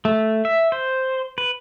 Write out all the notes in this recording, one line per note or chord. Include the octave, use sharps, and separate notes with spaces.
A3
E5
C5
B4